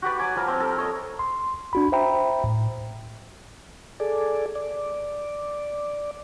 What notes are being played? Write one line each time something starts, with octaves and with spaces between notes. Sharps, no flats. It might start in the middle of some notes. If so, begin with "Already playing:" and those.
F#4 G4 B4 D5
F#3 G#5 D6
F3 G3 A#4
C4
A4 A#4
A4 C#5 D#5
C6
D4 F#4 B5
C5 E5 G5 A#5 B5
A2
G#4 A4 D5
D5